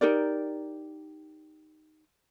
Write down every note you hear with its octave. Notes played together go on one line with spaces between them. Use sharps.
D#4 G4 A#4 D5